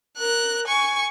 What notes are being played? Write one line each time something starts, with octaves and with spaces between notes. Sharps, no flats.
A#4 F#6
G#5 C#6